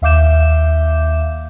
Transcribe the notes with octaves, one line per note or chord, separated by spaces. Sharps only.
D#2 E5 F5 D6 G6 E7